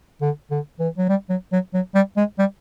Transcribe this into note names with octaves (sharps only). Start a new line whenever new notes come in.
D3
D3
E3
F#3
G3
F#3
F#3
F#3
G3
G#3
G3